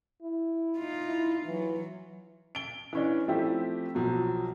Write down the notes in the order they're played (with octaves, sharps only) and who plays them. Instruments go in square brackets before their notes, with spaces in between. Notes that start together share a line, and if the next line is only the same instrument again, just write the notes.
[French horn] E4
[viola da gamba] D#4 F4
[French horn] E4
[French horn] E3 [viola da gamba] F#3
[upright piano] D7 G7
E3 C#4 D4
F3 A3 C4 E4 G4
B1 F3 F#3